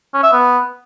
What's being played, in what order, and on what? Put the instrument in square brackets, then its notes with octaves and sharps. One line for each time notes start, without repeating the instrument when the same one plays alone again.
[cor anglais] C#4
E5
B3